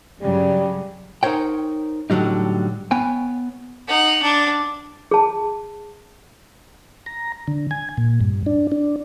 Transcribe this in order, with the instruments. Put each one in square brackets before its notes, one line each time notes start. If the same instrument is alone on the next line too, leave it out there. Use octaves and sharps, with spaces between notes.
[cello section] G2 C#3 F#3 [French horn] G3
[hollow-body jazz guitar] D#4 A#4 C5 C#5 G5
A2 D3 F#3 G3 D#4
B3 C#5 G5 G#5
[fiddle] D#4 F#5
D4
[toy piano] G#4 A5
[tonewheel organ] A#5
D3
G#5
A#2
G2
D4
D4